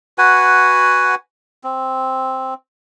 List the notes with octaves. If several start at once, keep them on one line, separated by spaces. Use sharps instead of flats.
F#4 B4 F#5 G#5
C4